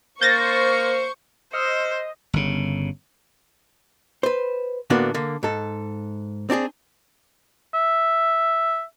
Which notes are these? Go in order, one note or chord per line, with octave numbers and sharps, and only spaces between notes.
A#3 C5 C#6 G6 A6 A#6
C5 D#5 E6 F6 C#7
G1 C#3
B4 C5
A2 D3 A#3 B3 D4 F#4
D3 A#3
G#2 A4
C4 D4 G4 G#4
E5